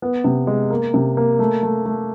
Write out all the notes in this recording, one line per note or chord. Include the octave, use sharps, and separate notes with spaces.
B3
C3
G#3
A#3
C3
A#3
A3
A3
A3